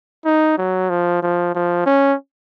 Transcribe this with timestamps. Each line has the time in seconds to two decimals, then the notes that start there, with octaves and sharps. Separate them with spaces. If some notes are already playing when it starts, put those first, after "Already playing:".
0.25 D#4
0.58 F#3
0.90 F3
1.23 F3
1.55 F3
1.86 C#4